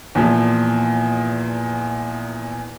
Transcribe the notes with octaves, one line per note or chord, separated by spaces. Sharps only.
E2 A#2 F3